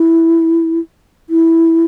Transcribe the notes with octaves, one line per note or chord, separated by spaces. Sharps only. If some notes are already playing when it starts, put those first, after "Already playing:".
Already playing: E4
E4